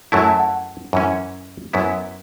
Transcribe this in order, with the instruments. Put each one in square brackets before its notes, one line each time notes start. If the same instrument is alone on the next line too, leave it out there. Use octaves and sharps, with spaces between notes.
[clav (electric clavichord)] F#2 F#3 A3 E4 [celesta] A5
[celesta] A5
F#5
[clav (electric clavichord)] F#2 E3 C#4
F#2 F#3 B3 E4